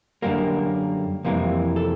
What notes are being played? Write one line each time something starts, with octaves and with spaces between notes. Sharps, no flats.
F#2 D3 G3 A#3 A#4
F2 C3 E3 G3 A#3
A4